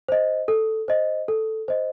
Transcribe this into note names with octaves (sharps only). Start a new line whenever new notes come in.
C5 D#5
A4
C5 D#5
A4
C5 D#5